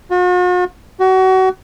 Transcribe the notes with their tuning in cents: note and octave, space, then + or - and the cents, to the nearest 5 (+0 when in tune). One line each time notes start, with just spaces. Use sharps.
F#4 -45
F#4 +30